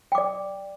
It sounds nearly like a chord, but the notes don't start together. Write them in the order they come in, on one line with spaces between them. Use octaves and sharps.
G5 D6 D5